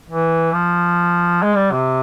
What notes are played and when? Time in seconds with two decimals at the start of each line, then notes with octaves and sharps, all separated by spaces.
0.10 E3
0.54 F3
1.42 G#3
1.56 G3
1.72 C3